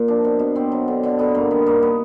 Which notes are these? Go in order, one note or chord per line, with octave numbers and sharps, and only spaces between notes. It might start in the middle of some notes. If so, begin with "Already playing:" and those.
Already playing: A#2
F3 D4
B2
B2
B2 C4
F#3
D3
D3
D3 B3
G2 A#3
D#3 B3
G2 A#3
B3